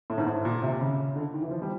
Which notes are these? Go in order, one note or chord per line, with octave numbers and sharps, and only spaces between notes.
A2
G#2
A2
A#2
C3
C#3
D3
D#3
E3
F3
G3